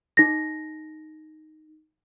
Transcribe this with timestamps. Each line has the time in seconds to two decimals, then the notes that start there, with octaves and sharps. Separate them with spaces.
0.17 D#4 A#6